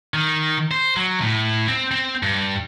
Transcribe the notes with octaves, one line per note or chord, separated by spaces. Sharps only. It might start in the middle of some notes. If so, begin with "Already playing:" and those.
D#3
C5
F#3
A2
C4
C4
G2